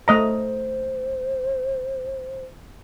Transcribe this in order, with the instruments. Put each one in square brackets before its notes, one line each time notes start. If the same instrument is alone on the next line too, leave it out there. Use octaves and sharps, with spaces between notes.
[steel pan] A3 D#5 A#5 [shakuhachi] C5